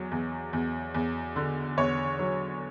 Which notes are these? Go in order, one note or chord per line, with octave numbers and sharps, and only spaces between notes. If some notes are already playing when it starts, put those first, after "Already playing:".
Already playing: E2 F#3
E2
E2
E2
D3
E2 C#5
F#3